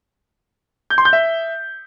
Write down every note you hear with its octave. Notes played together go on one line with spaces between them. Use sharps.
G6
C6
G6
E5